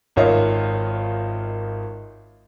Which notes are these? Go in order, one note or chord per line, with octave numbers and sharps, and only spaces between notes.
G#1 D#3 F4 C#5 D#5 E5